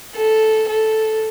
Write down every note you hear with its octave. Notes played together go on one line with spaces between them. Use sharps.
A4
A4